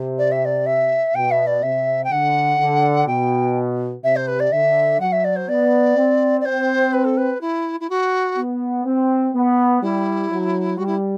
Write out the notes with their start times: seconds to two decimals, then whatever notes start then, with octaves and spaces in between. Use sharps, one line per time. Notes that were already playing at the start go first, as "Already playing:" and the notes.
Already playing: C3
0.18 D5
0.31 E5
0.45 D5
0.66 E5
1.15 B2 G5
1.31 E5
1.46 D5
1.63 C3 E5
2.04 G5
2.10 D3 F#5
2.59 D3
3.07 B2 G5
4.03 C3 E5
4.16 C5
4.27 B4
4.40 D5
4.51 D3 E5
5.00 F#3 F#5
5.12 E5
5.24 D5
5.36 C5
5.48 B3 D5
5.97 C4
6.40 D5
6.45 C4 C5
6.93 B4
7.05 A4
7.17 B4
7.41 E4
7.80 E4
7.89 F#4
8.37 B3
8.85 C4
9.34 B3
9.82 G3 E4
10.30 F#3
10.77 G3 F#4
10.86 E4